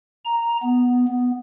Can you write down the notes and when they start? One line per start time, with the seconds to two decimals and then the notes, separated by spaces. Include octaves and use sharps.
0.25 A#5
0.63 B3
1.08 B3